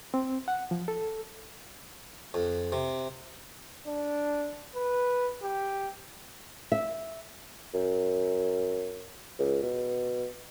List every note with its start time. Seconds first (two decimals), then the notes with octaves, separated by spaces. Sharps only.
0.14 C4
0.48 F#5
0.71 F3
0.88 A4
2.34 F2
2.72 C3
3.87 D4
4.75 B4
5.43 G4
6.72 E5
7.74 F#2
9.39 C#2
9.63 B2